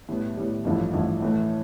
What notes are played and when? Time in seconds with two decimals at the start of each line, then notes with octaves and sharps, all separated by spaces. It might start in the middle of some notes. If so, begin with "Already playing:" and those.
0.09 A2 G3 B3
0.37 A2 G3 B3
0.65 A1 G2 F3 A3 E4
0.93 A1 G2 F3 A3 E4
1.22 A2 E3 A3